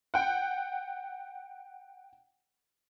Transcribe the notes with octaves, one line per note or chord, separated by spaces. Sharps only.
F#5 G5